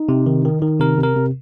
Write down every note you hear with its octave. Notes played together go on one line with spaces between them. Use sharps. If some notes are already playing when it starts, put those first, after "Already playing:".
Already playing: D#4
C3
D#3
D#3
D#3
C3 A#4
C3
A#4
C3